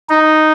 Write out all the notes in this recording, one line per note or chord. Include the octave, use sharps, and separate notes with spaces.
D#4